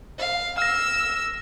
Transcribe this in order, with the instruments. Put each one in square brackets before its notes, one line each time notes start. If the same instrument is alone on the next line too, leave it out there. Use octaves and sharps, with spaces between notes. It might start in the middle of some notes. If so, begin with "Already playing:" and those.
[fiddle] F5
[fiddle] E6 [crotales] F6 A#6